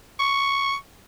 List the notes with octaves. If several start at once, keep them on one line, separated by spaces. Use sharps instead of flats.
C#6